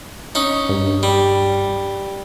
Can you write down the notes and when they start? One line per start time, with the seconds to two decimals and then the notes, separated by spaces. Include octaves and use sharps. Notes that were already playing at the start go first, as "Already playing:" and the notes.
0.35 C#4 D#4
0.69 G2
1.03 G3